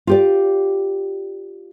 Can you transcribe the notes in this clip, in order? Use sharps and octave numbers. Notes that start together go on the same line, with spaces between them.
F4 G4 D5